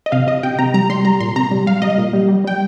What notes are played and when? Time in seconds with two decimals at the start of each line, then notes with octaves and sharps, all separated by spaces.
0.06 D#5
0.12 C3 F5
0.27 C3 D#5
0.43 C3 G5
0.59 C3 A#5
0.74 G3 A#5
0.90 G3 C6
1.05 G3 A#5
1.20 A#2 C6
1.36 C3 A#5
1.51 G3
1.67 G3 F5
1.82 G3 D#5
1.98 A#2
2.13 G3
2.29 G3
2.44 G3 G5